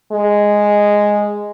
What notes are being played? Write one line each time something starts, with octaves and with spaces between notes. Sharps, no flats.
G#3